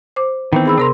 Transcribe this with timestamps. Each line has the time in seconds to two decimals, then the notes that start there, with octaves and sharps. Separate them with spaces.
0.16 C5 D6
0.53 D#3 E3 B3 C4
0.66 G#4 B5 E6
0.78 C3 D4 A#4 A#5 C6